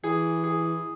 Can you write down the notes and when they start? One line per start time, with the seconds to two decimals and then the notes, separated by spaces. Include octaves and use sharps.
0.04 E3 G#4
0.44 G#4